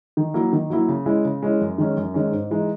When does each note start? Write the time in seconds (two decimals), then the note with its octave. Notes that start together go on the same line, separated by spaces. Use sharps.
0.17 D#3
0.34 F#3 A#3 E4
0.53 D#3
0.70 F#3 A#3 E4
0.88 C#3
1.06 G#3 C#4 E4
1.25 C#3
1.42 G#3 C#4 E4
1.61 F#2
1.78 D#3 G#3 C#4
1.97 F#2
2.14 D#3 G#3 C#4
2.32 G#2
2.51 E3 G#3 D#4